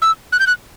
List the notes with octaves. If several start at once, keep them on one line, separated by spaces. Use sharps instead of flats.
E6
F#6
G6
F#6